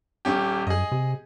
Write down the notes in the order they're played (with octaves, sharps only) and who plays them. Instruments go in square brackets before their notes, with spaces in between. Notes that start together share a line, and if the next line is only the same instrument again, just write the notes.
[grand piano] D#1 C#4 G4
[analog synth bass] F#2 [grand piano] G#4 D#5
[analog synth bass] C3